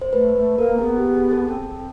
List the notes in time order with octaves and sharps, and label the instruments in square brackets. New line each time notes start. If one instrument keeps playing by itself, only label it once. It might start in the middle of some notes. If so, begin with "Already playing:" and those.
[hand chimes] C5
[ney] A3 [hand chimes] B4
[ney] A3 [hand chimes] B4
[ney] A#3 [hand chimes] A#4
[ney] C4
[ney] B3 [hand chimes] G#4
[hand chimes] G4
G#4
A4
[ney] C4 [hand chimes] A4